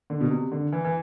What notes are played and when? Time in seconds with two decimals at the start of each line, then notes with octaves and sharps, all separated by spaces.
0.10 D3
0.21 B2
0.30 C3
0.52 D3
0.72 E3
0.85 E3